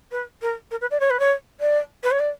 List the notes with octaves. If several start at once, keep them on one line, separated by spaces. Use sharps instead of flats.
B4
A#4
A#4
B4
D5
C#5
B4
C#5
D5
B4
C#5
D5